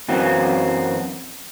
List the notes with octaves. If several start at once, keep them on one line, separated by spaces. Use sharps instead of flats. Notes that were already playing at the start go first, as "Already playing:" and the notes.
F#2 E3 F#3 A#3 C4